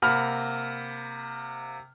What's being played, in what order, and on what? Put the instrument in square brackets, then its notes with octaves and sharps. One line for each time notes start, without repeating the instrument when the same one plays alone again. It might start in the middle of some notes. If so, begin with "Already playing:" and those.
[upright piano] C3 A#3 F#5 B5 F6